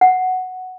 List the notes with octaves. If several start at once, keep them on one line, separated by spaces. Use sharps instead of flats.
F#5